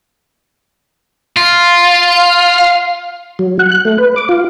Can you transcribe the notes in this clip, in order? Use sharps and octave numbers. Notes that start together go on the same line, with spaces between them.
F4
F#3
F#5
F#6
A3
B4
D6
F4